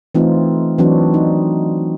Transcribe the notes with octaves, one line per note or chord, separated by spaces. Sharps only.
E3 A3 C4 D#4 F4
E3 F#3 C4 D4 D#4 F#4
D#4